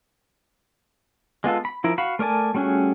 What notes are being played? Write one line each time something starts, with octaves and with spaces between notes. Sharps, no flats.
G#3 B3 F4 A4
B5
F3 E4 A#4
F#4 F5 B5
A3 A#4 D5 G#5 A5
G3 A3 C#4 F#4 G#4